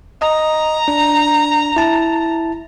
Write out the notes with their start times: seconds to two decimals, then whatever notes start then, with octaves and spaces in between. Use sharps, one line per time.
0.22 D#5 A#5
0.88 D4
1.76 E4 A5